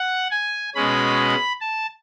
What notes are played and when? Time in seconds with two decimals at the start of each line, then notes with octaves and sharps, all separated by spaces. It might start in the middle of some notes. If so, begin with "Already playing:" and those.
Already playing: F#5
0.31 G#5
0.75 B2 G#3 C#4 B5
1.61 A5